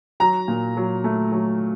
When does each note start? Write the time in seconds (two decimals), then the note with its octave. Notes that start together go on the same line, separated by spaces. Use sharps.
0.20 F#3 A#5
0.48 A#2
0.77 F#3
1.04 A3
1.32 F#3